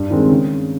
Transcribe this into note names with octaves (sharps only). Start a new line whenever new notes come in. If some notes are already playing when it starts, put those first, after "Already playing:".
Already playing: G2
D#3 G#3 C4
C#3